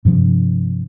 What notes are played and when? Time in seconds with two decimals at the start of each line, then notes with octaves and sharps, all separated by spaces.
0.05 G2 C3 F3